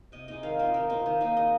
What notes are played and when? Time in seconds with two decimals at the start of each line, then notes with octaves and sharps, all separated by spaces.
0.12 C3 D#5
0.28 G#3 D#4 D#5
0.43 D#3 F5
0.59 C4 F4 D#5
0.74 D#3 A#4
0.90 C4 F4 C5
1.06 D#3 D#5
1.21 A#3 D#4 D#5
1.37 G#3 D#5